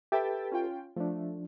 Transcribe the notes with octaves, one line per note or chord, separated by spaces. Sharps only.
G4 A4 B4 E5 G5 A6
C#4 F4 G5
F3 A3 D4